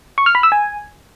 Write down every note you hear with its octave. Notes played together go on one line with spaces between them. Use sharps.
C#6
F6
B5
E6
G#5